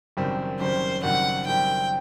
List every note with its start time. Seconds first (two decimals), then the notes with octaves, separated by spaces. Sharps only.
0.17 F#1 F#2 D#3 G3 C4
0.60 F#1 F#2 D#3 G3 C4 C5
1.03 F#1 F#2 D#3 G3 C4 F#5
1.47 F#1 F#2 D#3 G3 C4 G5